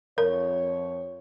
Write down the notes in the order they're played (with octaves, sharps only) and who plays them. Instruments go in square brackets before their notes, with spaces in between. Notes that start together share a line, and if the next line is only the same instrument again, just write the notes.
[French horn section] F2 F3 C#5 [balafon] A#4